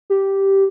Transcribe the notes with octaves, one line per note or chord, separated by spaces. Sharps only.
G4